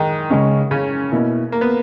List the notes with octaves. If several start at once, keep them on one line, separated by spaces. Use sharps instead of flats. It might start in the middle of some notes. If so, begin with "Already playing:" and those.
Already playing: D#3 G#3 D#4
C#3 G#3 C#4
C#3 C#4
B2 A#3 E4
A#3
B3